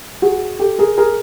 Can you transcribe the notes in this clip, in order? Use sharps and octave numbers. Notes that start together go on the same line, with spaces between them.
F#4 G#4
G4 A4
G#4 A#4
G#4 A#4